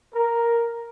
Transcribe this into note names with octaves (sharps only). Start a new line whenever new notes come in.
A#4